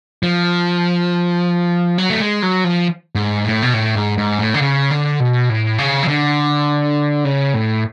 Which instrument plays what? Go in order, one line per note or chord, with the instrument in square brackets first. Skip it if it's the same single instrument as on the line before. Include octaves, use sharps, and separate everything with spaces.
[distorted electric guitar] F3
F#3
A3
G#3
F#3
F3
G#2
A2
B2
A2
G#2
G#2
A2
D3
C#3
D3
B2
A2
C#3
F3
D3
C#3
A2